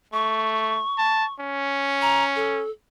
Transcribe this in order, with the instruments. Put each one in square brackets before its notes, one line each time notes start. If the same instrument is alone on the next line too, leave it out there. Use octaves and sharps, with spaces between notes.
[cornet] A3 [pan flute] C#6
[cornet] A5
C#4
[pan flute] A#5
A4